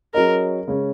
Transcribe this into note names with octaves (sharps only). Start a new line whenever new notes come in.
F#3 C#4 G#4 A#4 D#5
C#3 G#3 C#4